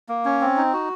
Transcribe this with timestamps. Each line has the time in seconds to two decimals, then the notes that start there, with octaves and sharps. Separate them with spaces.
0.09 A#3
0.25 C#4
0.41 C4
0.57 D#4
0.73 F#4